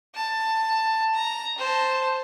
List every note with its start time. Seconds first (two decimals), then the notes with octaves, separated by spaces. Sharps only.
0.15 A5
1.14 A#5
1.58 C5 A5